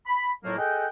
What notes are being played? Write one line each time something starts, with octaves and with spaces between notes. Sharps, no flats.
B5
F2 A2 F#3 A3 A#3
G#4 A4 D#5 F#5 G5